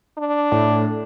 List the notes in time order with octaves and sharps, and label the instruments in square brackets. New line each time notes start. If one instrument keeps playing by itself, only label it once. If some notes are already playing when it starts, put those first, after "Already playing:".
[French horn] D4
[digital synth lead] A2